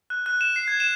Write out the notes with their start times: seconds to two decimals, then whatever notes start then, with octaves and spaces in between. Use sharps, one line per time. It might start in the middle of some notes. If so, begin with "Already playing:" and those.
0.10 F#6
0.26 F#6
0.41 E7
0.56 C7
0.68 G#6
0.80 E7